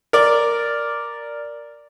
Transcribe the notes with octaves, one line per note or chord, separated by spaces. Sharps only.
A#4 D5